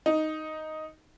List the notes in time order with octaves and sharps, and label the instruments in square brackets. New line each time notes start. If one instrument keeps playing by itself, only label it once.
[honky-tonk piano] D#4